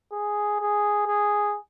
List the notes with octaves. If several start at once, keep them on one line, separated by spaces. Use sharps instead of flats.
G#4
G#4
G#4